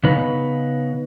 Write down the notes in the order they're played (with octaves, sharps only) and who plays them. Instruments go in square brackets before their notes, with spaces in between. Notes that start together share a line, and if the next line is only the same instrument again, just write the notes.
[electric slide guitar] C#3 B3 D#4 B4